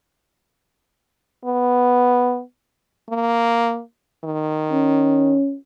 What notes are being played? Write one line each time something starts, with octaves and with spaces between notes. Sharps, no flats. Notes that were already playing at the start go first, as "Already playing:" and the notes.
B3
A#3
D#3
C#4